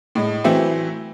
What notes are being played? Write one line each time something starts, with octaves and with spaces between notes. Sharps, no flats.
A2 G#3
E3 F#3 A3 C4 E4